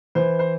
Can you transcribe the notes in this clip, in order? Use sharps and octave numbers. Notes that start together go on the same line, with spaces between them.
E3 C5
C5